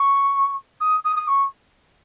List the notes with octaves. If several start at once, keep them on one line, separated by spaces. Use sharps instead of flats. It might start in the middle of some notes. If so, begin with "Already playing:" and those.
Already playing: C#6
D#6
D#6
D#6
C#6